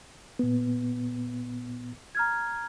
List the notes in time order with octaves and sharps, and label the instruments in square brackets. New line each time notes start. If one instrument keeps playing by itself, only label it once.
[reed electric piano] A#2 B3
[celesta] A#5 F6 G#6